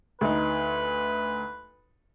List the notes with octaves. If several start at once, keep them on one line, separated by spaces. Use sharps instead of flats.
D2 D#4 B4